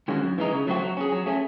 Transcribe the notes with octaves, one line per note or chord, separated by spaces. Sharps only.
D#3 G#3 C#4 F#4
F#2
E3 G#3 D#4
C#3
F#3 A3 C4 F#4
F#3
C#4 G#4
F#3
A3 C#4 G#4